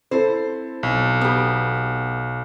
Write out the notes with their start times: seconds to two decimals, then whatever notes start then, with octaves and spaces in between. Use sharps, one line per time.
0.11 C4 E4 A4 C5
0.83 B1
1.21 B3 G4